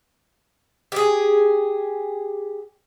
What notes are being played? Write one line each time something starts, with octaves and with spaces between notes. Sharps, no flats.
G4 G#4